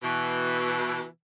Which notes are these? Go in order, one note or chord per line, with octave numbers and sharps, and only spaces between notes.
B2 E3